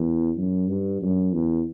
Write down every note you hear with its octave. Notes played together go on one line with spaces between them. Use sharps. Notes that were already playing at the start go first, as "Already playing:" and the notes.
Already playing: E2
F#2
G2
F#2
E2